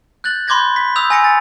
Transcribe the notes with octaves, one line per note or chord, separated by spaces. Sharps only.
F#6 G6 A6 F#7
B5 C6 D6 G6 G#6 A#6
B6
D#6 E6 G6 F7
G#5 A#6 C#7
A6